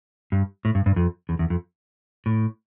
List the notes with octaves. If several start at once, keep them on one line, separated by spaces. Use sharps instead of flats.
G2
A2
G2
G2
F2
E2
E2
F2
A2